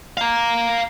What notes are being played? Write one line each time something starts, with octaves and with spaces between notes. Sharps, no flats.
F5 A#5